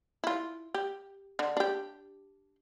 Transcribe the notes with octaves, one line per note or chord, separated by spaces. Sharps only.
E4 F4
G4
D3
D4 G4